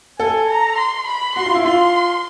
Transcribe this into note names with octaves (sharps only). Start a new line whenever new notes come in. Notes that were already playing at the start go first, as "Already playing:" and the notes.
A4 G#5
A#5
C6
B5
F#4 C6
F4
E4
F4 C6